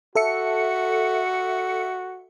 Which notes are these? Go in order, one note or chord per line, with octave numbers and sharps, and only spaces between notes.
F#4 A4 E5 C#7